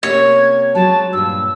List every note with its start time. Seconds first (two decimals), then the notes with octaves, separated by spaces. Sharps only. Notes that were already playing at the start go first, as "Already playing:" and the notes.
0.03 C3 A#3 C#4 C#5 G#6
0.75 F#3 G#3 A5
1.13 G2 A#2 E6